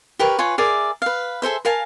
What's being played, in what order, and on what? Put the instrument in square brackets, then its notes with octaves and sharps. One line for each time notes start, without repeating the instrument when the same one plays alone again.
[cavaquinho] G4 A#4 B4 C#5
F4 B4 C#5 G#5
G#4 A#4 D5 E5
B4 F5
G#4 A4 C5 E5
A#4 F5 G#5 A5